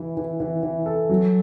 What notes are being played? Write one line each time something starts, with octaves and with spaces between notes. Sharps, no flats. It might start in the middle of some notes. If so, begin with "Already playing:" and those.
Already playing: E3 E4
E3
E3
E3
A4
F#3